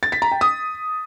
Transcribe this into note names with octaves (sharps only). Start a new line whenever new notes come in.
A6
B6
A#5
G5
D#6